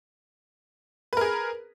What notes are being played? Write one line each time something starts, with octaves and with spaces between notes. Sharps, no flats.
G#4 A#4 B4